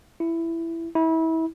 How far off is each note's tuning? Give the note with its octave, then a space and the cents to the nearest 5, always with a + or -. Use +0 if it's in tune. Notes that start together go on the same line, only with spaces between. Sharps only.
E4 +10
E4 -30